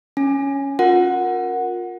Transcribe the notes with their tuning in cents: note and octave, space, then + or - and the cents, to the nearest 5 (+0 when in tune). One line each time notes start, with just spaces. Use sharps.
C#4 +0 G#5 +0
F4 +30 A#4 +0 F#5 +0